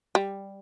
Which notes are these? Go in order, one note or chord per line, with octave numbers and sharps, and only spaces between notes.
G3